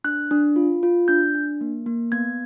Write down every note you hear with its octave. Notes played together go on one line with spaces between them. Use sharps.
D4 F#6
D4
F4
F4
D4 G6
D4
A#3
A#3
B3 G#6